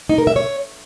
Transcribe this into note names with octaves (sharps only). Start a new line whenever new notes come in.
D#4
A#4
E5
C#5